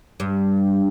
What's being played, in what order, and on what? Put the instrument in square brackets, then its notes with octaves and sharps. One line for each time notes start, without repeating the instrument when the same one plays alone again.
[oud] G2